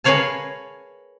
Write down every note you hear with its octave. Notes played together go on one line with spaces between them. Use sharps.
G#4 A#4 B4 C#5 F5 A5